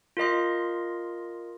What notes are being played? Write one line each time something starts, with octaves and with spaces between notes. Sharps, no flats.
F4 A#4 D#5 C6